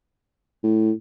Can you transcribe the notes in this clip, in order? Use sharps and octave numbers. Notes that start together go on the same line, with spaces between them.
A2